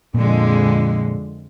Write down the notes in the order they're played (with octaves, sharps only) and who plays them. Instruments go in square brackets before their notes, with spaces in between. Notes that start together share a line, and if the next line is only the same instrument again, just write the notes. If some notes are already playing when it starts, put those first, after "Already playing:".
[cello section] F2 D3 G#3 [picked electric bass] A#2